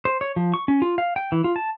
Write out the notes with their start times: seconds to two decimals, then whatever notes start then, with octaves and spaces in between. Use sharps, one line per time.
0.05 C5
0.21 C#5
0.36 F3
0.54 C#6
0.68 C#4
0.82 F4
0.98 F5
1.16 G5
1.32 E3
1.44 F4
1.56 A5